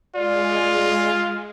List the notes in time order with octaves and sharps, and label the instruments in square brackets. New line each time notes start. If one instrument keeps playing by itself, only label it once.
[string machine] G#3 [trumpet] F4 [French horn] D5